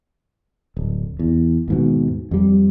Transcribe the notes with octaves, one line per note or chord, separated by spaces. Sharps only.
D1
E2
D#2 G#2 B2
F2 G3